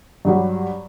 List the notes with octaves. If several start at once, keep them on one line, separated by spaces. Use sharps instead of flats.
G2 F#3 G3